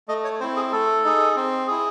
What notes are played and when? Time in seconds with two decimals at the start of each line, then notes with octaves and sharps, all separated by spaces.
0.08 A3 D#5
0.24 C#5
0.40 C4 E4 C5
0.56 G#4
0.72 A3 A4
1.04 D#4 G#4
1.36 C4
1.68 E4 G#4